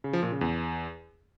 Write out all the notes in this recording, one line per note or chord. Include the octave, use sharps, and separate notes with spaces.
C#3
F3
A#2
C#3
E2